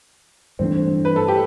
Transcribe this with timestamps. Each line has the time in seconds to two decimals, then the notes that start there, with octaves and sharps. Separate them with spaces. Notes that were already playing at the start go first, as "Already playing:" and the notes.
0.59 G2 E3 A3 C4 D4
1.05 B4
1.16 A4
1.28 G4